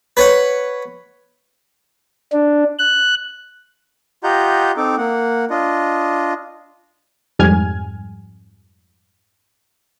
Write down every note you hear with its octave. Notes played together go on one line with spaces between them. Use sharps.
B4 C#5 F#5
D4
F#6
F4 G4 D#5 F#5 A#5 G6
C4 D#4 A4 D6
A#3 F#5
D4 F4 D#5
F2 G#2 G3 G#5 F6 G#6